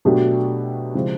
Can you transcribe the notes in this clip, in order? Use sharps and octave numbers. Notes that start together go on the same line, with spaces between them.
B2 F#3 A3 D4 G4
C#3 F3 G#3 C4 E4